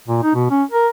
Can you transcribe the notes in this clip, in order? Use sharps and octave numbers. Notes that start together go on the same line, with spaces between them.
A#2
D#4
B2
C#4
A#4